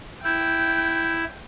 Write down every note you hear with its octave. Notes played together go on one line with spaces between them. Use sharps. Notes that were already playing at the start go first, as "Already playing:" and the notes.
E4 G5 G6